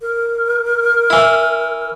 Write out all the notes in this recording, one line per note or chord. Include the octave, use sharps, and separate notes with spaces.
A#4
E3 E4